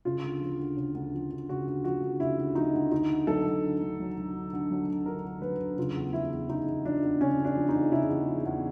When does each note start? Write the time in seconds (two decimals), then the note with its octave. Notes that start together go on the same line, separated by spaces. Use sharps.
0.05 C#3 F4
0.24 D2
0.41 F3
0.59 D2
0.77 C#3
0.95 D2
1.14 F3
1.31 D2
1.49 C#3 F#4
1.67 D2
1.84 F3 F#4
2.02 D2
2.20 C#3 E4
2.38 D2
2.55 F3 D#4
2.74 D2
2.91 D3 D#4
3.10 D2
3.27 F#3 A4
3.46 D2
3.64 D3
3.81 D2
4.00 F#3
4.17 D2
4.35 D3
4.53 D2
4.70 F#3
4.88 D2
5.06 D3 A#4
5.25 D2
5.42 F#3 B4
5.59 D2
5.78 C#3 F4
5.95 E2
6.13 F3 E4
6.31 E2
6.49 C#3 D#4
6.67 E2
6.85 F3 D4
7.03 E2
7.21 C#3 C#4
7.38 E2
7.45 D4
7.56 F3
7.69 D#4
7.74 E2
7.92 C#3 E4
8.09 E2
8.28 F3
8.45 E2